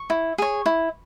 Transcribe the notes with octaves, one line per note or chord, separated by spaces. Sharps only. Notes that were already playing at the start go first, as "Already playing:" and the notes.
Already playing: C#6
E4
G#4 C#5
E4